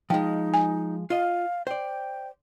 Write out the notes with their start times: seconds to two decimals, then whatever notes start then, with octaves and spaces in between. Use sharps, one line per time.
0.10 F3 G#3 D#4 G5
0.54 G#5
1.10 F4 D#5 F5
1.67 C5 D5 G5